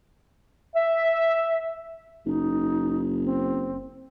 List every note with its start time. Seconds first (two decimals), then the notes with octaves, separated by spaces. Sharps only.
0.76 E5
2.26 F#1 D#4
3.23 C4